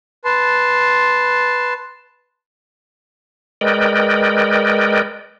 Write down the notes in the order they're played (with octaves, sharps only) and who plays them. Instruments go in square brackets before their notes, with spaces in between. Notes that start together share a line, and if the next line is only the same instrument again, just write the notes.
[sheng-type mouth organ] B4 A5 C6
[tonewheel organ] G#3 A#4 B4 D5 D#5 G5